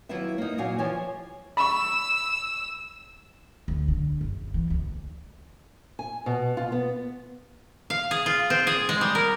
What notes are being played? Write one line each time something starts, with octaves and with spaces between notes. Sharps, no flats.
D#2 F#3 E4 F4 B4 E5
A#3 D#4
A#2 F#3 F#4 F5 G#5
E3 F3 G4 C#5 G#5
B5 C#6 E6
D2
D3
F#1
E3
D2
G#5
B2
F4
B3
F5
G#4
F4
C4
G#4
G#3
G3
A#4